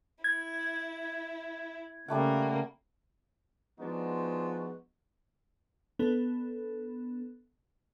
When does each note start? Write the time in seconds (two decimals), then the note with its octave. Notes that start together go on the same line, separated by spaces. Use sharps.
0.24 E4 G#6
2.08 C#3 G3 A3 A#3 F#5
3.79 F3 G#3 B3 D4 D#4 F#4
5.99 B3 D4 A4 B5